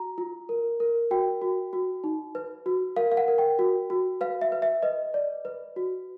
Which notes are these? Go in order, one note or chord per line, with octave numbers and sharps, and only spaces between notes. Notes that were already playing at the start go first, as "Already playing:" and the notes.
Already playing: F#4 A#5
F4
A#4
A#4
F#4 G5
F#4
F#4
D#4
B4
F#4
A#4 F5
F5
F#5
A#4
G5
F#4
F#4
B4 F5
E5
B4
E5
B4 D#5
D5
B4
F#4